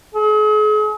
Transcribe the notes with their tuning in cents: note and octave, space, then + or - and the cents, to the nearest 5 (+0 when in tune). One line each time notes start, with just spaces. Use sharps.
G#4 +40